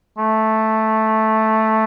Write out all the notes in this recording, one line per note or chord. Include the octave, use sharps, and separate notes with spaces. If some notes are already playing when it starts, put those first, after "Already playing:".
A3